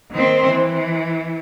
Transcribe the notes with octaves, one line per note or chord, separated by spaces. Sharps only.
D#3 C4
E3